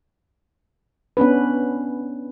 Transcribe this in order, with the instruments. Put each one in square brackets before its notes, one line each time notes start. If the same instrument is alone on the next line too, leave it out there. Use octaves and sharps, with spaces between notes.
[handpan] B3 C#4 D4 B4